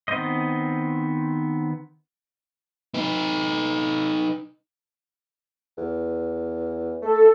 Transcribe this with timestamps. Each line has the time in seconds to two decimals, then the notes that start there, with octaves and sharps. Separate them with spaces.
0.08 D#3 B3 C4 C5 D#5
2.94 D#4 B4
5.78 E2
7.02 A3 A4